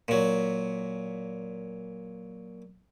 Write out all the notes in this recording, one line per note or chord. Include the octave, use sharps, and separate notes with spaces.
A#2 F#3